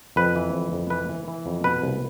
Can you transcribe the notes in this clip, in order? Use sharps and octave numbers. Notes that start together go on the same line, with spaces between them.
F2 B4
E3
F2
F2
E3 B4
E3
E3
F2
B2 B4
C2